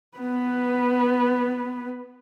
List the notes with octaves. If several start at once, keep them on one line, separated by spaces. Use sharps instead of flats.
B3 B4